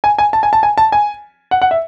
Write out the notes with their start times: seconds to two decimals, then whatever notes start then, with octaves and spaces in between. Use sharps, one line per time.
0.04 G#5
0.18 G#5
0.33 A5
0.43 G#5
0.53 A5
0.63 G#5
0.78 A5
0.92 G#5
1.51 F#5
1.62 F#5
1.71 E5